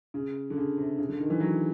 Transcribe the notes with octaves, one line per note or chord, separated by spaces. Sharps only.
C#3
D3
C#3
C3
C#3
D3
D#3
E3
F#3